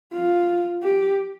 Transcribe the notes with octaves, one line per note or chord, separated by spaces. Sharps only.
F4
G4